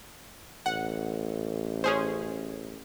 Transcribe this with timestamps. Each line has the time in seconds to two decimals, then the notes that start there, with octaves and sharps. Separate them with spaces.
0.66 A1 F#5
1.84 C#4 G#4 C5